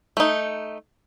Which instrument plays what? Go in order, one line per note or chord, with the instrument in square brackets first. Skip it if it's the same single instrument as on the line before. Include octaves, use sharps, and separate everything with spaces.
[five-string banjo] A3 D#4